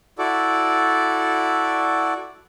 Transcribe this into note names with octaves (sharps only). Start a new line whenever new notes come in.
E4 F#4 A4 D5